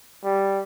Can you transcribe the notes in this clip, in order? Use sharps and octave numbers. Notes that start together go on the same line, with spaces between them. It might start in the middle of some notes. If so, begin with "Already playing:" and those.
G3